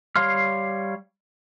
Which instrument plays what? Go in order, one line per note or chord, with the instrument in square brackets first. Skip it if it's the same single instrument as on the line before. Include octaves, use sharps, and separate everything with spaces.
[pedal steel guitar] G3 C#5 F5 C6 F6